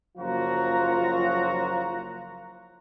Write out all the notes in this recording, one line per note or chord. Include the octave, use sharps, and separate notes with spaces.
F#1 F3 F#3 F4 F#4 A#5